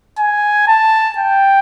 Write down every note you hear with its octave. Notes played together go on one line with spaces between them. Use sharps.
G#5
A5
G5